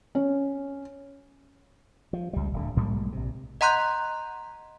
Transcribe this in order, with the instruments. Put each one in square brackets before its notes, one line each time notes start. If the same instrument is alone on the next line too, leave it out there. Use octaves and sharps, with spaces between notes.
[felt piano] C#4
[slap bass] F3
C#2 G3
D1 D3
B1 G#2 G3 A#3
A#1 C3
[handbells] D#5 F#5 A#5 C6 F#6 G6